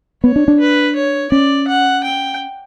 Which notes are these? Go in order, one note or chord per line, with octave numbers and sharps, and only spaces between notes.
B3 C#5
D4
D4
B4
C#5
C#4 D5
F#5
G5